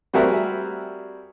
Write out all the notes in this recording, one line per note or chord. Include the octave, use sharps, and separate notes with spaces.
G3 C4 F#4 G#4 A#4 E5